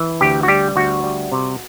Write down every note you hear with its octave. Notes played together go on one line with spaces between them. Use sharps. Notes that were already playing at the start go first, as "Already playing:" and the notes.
Already playing: E3
D2 G4
F#4
G3 G4
D2 F#4
G3
C3